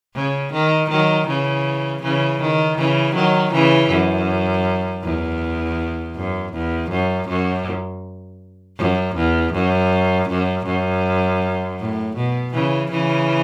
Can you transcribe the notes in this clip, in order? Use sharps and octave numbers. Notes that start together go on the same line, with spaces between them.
C#3
D#3
D#3 F#3
C#3 E3
C#3 E3
D#3
C#3 E3
D#3 F#3
C#3 E3
F#2
E2
F#2
E2
F#2
F#2
F#2
E2
F#2
F#2
F#2
A2
B2
C#3 E3
C#3 E3